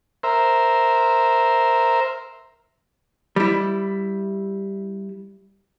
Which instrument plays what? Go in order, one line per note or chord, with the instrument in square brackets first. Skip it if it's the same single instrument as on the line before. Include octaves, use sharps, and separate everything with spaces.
[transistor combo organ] A#4 C5 E5
[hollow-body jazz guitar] G3 E4